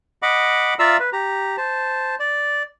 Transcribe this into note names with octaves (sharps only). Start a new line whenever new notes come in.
D#5 F#5 B5 D6
F4 D5 E5 F5 A#5 E6
B4
G4 A#5
C5 A5
D5